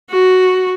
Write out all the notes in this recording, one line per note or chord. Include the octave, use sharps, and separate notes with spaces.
F#4